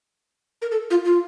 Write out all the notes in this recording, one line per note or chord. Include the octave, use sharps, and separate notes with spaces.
A#4
A4
F4
F4